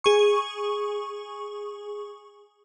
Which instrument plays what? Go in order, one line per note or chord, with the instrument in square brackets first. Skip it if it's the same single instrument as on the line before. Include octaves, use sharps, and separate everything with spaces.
[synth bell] G#4 C#6